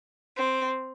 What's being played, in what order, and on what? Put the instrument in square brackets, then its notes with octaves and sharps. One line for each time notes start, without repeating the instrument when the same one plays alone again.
[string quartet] C4